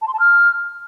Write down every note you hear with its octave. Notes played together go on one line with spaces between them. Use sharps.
A5
C6
A5
F6